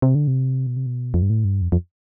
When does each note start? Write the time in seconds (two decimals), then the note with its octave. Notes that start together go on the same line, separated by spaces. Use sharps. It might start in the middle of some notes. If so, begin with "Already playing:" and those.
0.02 C3
0.15 D3
0.27 C3
0.67 B2
0.77 C3
0.86 B2
1.14 F2
1.22 G2
1.30 A2
1.45 G2
1.62 F2
1.72 F2